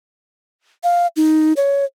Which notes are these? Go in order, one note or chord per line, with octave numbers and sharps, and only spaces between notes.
F5
D#4
C#5